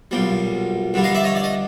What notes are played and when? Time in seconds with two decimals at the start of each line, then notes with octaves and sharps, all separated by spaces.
0.11 B1 A#2 G3
0.94 G2 D3 G3
1.04 D#5 F5
1.14 D5 E5
1.24 C#5 D#5
1.35 D5
1.44 D#5